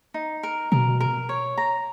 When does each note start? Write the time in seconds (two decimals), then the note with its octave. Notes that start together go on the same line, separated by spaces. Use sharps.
0.14 D#4
0.43 A#4
0.72 B2 A#4
1.00 A#4
1.29 C#5
1.58 A#5